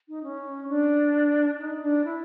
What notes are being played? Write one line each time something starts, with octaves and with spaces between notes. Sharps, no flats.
D#4
C#4
D4
D#4
D4
E4